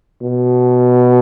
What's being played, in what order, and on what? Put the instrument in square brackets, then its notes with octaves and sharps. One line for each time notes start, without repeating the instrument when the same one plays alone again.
[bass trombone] B2